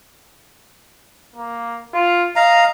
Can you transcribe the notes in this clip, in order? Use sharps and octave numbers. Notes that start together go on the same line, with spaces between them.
A#3
F4
D#5 F5 A#5